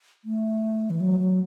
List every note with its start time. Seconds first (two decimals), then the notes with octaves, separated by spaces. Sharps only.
0.25 A3
0.90 E3
1.00 F#3
1.19 F#3